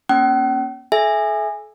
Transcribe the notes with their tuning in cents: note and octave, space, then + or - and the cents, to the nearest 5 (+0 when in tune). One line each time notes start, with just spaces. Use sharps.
A#3 +35 C#4 +0 G5 -45
A4 -40 E5 +0 G#5 -10